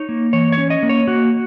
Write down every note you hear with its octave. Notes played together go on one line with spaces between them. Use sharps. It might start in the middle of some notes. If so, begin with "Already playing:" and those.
Already playing: D#4 C#5
A#3
E3 C#5
C#5
C#4
D#5
A#3
C#5
A#3 F#4